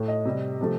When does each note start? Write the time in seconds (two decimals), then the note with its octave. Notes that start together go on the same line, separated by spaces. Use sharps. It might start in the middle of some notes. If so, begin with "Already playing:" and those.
Already playing: A2 A3
0.08 D#5
0.25 C3 G3
0.61 C3 F3 A3